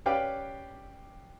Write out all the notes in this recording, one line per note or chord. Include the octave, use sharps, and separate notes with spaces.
C#4 G4 B4 D5 F5 G5